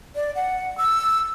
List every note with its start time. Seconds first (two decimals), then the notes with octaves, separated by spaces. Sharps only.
0.15 D5
0.35 F#5
0.78 E6